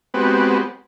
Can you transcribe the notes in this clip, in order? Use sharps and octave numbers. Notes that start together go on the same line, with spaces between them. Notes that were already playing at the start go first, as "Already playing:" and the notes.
G#3 B3 C4 F#4 G4 B4